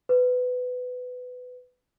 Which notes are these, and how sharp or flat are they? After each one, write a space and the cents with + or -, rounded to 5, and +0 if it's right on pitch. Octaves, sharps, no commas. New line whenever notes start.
B4 +20